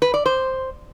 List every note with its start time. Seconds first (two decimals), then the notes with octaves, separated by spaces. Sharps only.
0.02 B4
0.14 D5
0.26 C5